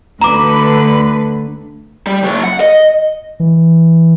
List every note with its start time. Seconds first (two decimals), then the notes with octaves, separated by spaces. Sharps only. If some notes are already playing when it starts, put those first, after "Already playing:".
0.21 D2 D3 B4 A#5 D6
2.07 G3
2.23 C#3 F#3
2.44 F#5
2.60 D#5
3.40 E3